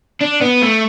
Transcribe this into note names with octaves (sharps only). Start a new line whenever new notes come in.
D4
B3
A3